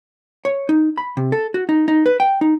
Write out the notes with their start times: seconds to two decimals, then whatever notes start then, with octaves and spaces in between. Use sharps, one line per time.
0.45 C#5
0.69 D#4
0.98 B5
1.17 C3
1.32 A4
1.54 F#4
1.69 D#4
1.88 D#4
2.06 B4
2.20 G5
2.41 D#4